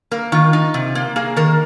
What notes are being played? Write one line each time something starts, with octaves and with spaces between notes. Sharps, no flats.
A#3 A#4
D#3 F4
D#4
C3
A#3
A#3 G#4
D#3 A#4